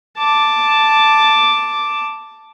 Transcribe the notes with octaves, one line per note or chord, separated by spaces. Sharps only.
A5 D6